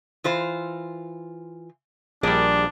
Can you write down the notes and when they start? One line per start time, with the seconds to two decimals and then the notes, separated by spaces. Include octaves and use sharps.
0.24 E3 F4 C5
2.23 A#1 G3 D4 G#4 A#4 D5